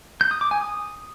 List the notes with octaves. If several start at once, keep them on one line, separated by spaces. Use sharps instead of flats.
G6
D#6
D6
G#5
D#6